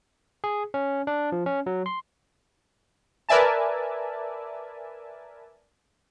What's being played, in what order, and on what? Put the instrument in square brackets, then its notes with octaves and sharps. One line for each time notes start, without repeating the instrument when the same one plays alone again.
[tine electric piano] G#4
C#4
D4
F3
C#4
F#3
C6
[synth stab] A#4 B4 D5 E5 G#5 A5